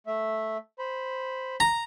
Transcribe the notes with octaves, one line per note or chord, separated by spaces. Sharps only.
A3 E5
C5 B5
A#5